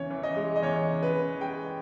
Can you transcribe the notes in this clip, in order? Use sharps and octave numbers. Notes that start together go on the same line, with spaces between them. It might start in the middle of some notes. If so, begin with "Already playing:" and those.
Already playing: E2 C#3 E3 C#5
E3
D#5
G#3
D#5
E2 C#5
C#3
B4
E2
G#3 G5